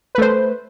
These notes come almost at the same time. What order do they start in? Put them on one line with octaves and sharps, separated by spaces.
B4 A3 C5